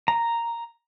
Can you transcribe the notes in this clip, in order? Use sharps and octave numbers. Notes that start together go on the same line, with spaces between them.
A#5